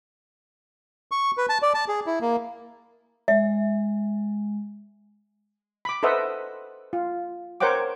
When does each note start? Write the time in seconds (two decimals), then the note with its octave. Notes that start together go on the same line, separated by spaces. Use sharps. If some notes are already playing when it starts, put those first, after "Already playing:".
1.11 C#6
1.37 B4
1.49 A5
1.62 D5
1.74 A5
1.88 G#4
2.06 E4
2.21 A#3
3.28 G#3 E5
5.85 B5 D6
6.03 A4 B4 C5 D#5 E5 F#5
6.93 F4
7.60 A#4 C5 C#5 F#5 G5 D6